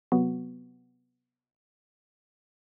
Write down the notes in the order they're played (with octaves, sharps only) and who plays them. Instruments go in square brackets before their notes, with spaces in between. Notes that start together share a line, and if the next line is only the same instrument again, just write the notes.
[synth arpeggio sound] C3 F#3 B3 F#4